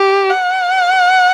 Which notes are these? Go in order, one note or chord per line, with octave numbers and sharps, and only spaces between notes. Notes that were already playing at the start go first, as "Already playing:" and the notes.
Already playing: G4
F#5